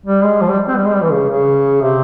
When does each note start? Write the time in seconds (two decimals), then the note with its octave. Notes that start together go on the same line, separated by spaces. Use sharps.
0.06 G3
0.24 G#3
0.41 F3
0.50 G3
0.68 C4
0.76 G3
0.85 G#3
0.94 G3
1.03 E3
1.12 C#3
1.29 C#3
1.82 C3